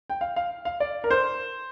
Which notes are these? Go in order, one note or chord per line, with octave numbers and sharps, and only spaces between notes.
G5
F5
F5
F5
D5
A#4
C5